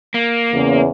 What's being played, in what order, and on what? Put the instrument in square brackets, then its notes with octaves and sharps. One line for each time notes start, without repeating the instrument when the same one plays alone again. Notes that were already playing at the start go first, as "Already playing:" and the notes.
[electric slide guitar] A#3
[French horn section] E2 C#3